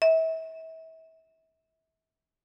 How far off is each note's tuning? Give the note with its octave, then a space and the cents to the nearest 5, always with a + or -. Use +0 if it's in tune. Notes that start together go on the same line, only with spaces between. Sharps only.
E5 -35